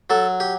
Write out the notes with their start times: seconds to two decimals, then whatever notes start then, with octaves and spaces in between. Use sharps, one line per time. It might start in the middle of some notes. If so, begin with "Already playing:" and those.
0.10 F#3 A4
0.40 G4